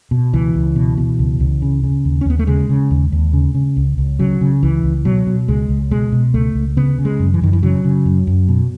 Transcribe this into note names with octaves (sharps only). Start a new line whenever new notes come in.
B2
C#2 E3
C#2
B2
B2
C#2
C#2
C#3
C#3
D#2
C#4
D#2 B3
A3
C#3 G#3
C#3
D#2
D#2
C#3
C#3
C#2
C#2
C#3 F#3
C#3
C#2 E3
C#2
B2 F#3
B2
C#2 G#3
C#2
B2 G#3
B2
C#2 A3
C#2
C#3 B3
C#3
G#3
F#2
E3
F#2 D#3
E3
C#3 F#3
C#3
F#2
F#2
B2